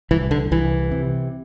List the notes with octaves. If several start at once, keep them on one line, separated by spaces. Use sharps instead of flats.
C2 E3
D3
C2 E3
C3